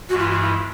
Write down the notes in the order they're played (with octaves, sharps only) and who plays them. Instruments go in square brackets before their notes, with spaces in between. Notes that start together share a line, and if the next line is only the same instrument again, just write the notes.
[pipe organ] G2 E3 G#3 [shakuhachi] F#4
[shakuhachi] F4
F4
E4